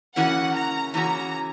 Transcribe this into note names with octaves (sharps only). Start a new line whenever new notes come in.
C#3 E3 A#3 C#4 F#4 F#5
A#5
C#3 E3 A#3 C#4 F#4 A#5